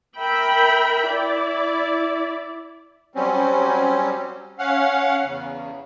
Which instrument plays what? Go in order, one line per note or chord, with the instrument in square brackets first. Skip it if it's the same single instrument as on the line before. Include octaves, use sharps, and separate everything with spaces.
[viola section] A#4 E5 G5 B5
E4 D5
[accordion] F#3 G3 C4 C#4
C#4 F5 F#5
E2 C#3